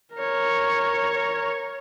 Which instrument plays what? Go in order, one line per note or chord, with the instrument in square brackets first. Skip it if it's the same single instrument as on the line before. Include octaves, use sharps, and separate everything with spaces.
[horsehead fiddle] A#4 C#5